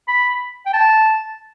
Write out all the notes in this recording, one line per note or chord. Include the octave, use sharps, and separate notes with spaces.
B5
G5
A5